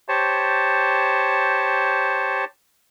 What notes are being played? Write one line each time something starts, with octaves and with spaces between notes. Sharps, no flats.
G4 C5 C#5 A5